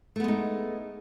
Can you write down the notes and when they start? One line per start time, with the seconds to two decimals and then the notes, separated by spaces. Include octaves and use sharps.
0.16 A3
0.20 B3
0.24 G#3
0.28 D#4